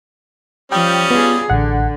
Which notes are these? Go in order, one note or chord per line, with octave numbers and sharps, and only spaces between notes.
F3 G3 C#4 G5 D#6
B3 F4 G#4
A1 D3 F#5